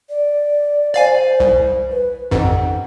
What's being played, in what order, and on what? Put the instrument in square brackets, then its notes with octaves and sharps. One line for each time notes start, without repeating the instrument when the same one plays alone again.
[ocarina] D5
[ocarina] C5 [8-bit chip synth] D5 F5 G#5
[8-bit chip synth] C2
[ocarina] B4
[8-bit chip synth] A1 F2 G#2 [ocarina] F#5